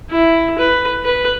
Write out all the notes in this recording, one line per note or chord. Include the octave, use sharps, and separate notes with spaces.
E4
B4
B4